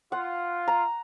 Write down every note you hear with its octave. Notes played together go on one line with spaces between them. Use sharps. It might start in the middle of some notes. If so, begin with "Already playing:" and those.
F4 F#5
A#5